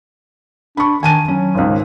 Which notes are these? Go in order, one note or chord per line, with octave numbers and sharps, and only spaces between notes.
D4 B5 C#6
D#3 G#5 A5 D#7
F#3 C#4
G#1 C#2